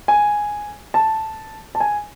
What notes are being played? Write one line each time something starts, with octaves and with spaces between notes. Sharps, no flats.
G#5
A5
A5
G#5